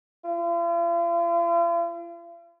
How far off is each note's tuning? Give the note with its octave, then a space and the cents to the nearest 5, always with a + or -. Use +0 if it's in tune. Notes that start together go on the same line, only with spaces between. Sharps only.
F4 -45